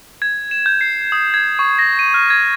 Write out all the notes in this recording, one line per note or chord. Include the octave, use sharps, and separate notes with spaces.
G#6
E7
G6
C7
D#6
G#6
C#6
A#6
D#7
F6
G#6